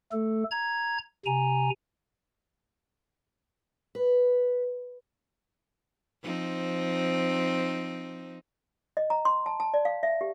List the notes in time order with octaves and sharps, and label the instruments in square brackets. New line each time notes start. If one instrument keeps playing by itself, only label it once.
[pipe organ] A3 A4
A#5 G#6
C3 G#5 A#5
[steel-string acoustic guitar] B4
[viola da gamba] F3 C4 D#4
[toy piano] D#5
A#5
C6
A5
A5
D5
F5
E5
G4